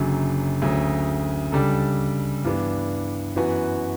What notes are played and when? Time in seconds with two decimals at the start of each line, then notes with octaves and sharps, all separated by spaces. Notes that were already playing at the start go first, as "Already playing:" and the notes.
Already playing: F#1 F#2 D3 F#3
0.62 D2 C#3 F#3
1.52 C#2 C#3 G3 D4 A4
2.44 G2 E3 B3 D4
3.36 F#2 E3 B3 F#4 B4